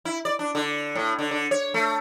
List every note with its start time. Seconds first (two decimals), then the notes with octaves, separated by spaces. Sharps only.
0.05 E4
0.25 D5
0.39 D4
0.55 D3
0.95 A2
1.19 D3
1.31 D3
1.51 C#5
1.74 A3